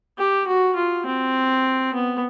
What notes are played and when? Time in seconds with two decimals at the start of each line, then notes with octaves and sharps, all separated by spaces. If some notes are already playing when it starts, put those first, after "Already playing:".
0.18 G4
0.47 F#4
0.76 F4
1.06 C4
1.94 B3